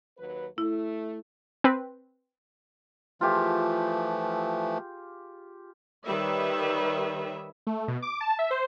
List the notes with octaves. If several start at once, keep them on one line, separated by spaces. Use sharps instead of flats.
D#2 F#3 B4
A3 E4
C4 B4
E3 F3 A3 F4 G4 G#4
D#3 G3 B4 C#5 E5
A3
B2
D6
A5
E5
C5